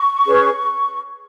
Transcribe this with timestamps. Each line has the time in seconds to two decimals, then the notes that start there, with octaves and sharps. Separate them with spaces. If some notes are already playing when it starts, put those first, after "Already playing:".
Already playing: C#6
0.26 C#4 G#4 B4